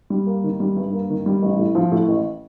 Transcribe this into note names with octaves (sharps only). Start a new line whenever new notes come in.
G3
A#3
D#3
G3
G2
A#3
D#3
G3
A1
A2
F3
A2
A1